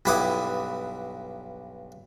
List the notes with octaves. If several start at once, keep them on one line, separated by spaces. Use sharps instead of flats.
B1 G2 E4 F#5 D6 D#6